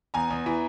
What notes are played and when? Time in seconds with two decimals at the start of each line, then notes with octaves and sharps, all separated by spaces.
0.14 E2 G#5 A#5
0.30 E2
0.46 E3